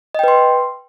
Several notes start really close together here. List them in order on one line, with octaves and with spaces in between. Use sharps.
D#5 G5 B4 C6